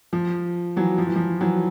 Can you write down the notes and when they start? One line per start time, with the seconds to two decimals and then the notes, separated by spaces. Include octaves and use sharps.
0.13 F3
0.76 E3 F#3
0.98 F3
1.07 E3
1.16 F3
1.41 E3 F#3